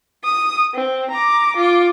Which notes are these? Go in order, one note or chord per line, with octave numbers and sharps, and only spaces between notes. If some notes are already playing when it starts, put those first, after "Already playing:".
D#6
C4
A#5 D6
F4 D6